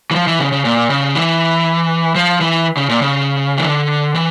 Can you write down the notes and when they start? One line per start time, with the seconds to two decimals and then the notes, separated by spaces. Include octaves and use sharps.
0.11 E3
0.15 F3
0.27 E3
0.39 C#3
0.52 C#3
0.65 A#2
0.90 C#3
1.15 E3
2.15 F3
2.41 E3
2.77 C#3
2.89 A#2
3.02 C#3
3.57 E3
3.64 D3
4.15 E3